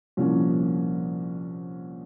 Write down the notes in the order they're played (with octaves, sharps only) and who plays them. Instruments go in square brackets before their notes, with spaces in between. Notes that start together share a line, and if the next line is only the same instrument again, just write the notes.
[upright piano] C2 A#2 F3 A#3 C#4